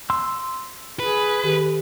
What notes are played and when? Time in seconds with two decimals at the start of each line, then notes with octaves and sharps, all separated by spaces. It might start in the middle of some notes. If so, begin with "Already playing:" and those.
0.10 C6 E6
0.99 G#4 B4
1.44 D#3 G4 A4